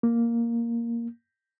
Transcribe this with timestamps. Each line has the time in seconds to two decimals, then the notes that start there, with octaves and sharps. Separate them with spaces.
0.03 A#3